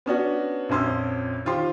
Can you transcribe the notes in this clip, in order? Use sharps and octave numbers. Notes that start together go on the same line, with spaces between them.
B3 C#4 D4 F#4
A#1 F2 C#4 C6 E6
D#3 F4 G4 C5 C6